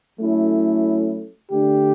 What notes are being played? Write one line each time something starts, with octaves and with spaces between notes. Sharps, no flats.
F#3 A3 C#4 E4
D3 A3 D4 G4